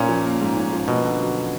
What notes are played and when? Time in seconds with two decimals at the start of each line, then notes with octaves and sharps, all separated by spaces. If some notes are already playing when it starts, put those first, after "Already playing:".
Already playing: A#2 C#4
0.08 F3
0.25 A#3
0.40 G#2
0.57 C#4
0.73 F3
0.88 B2 A#3
1.05 D3
1.20 F#3